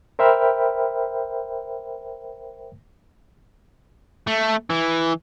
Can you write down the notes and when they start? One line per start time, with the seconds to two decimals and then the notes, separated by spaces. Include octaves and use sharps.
0.19 A#4 C5 E5 G5 B5 F6
4.27 A3
4.70 E3